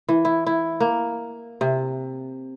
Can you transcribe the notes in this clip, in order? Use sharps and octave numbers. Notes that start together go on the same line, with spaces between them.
E3
E4
E4
A#3
C3